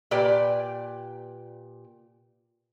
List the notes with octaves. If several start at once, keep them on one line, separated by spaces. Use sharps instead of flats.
A#2 G4 B4 D5 G5